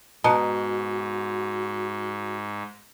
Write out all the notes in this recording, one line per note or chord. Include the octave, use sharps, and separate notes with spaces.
G#2 B2 F#4 A5 A#5 D#6